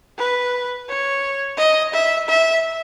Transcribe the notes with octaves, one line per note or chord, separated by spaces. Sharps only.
B4
C#5
D#5
E5
E5